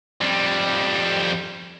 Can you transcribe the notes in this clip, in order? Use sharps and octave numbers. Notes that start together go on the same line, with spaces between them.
F2 G3